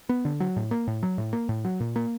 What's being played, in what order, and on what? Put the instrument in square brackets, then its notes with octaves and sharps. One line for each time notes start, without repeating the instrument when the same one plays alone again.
[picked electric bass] B3
D3
F#3
A2
A#3
A2
F#3
A2
A#3
A2
F#3
A#2
A#3